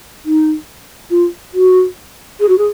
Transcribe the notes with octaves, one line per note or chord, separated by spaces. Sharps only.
D#4
F4
F#4
G#4
F#4
G#4